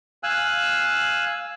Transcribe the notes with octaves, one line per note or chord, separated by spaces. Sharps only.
F5 G#5 E6 F#6